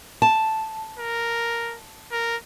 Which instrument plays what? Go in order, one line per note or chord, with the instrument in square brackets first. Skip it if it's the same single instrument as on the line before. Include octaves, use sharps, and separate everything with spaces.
[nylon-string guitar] A5
[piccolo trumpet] A#4
A#4